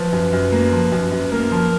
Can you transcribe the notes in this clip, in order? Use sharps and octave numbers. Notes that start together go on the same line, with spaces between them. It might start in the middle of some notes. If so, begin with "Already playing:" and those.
Already playing: F3 B4
F#2
F#2
A#3
F3
F#2
F#2
A#3 A#4
F3